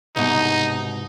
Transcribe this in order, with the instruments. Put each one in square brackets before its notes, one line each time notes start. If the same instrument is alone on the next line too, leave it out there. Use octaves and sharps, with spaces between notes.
[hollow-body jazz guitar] C2 G#2 B2 [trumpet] D#4